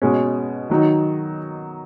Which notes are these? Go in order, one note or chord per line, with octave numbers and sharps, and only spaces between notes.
B2 G#3 C#4
D#3 F#3 D#4